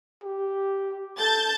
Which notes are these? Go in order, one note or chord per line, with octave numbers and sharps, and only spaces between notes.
G4
A4 A5 G6 A6